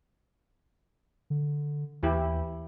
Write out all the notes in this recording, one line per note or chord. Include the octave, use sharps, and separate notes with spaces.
D3
D#2 E3 E4 G4